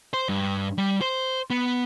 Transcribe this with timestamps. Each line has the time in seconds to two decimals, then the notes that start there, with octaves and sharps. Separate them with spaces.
0.14 C5
0.29 G2
0.78 G3
1.01 C5
1.50 B3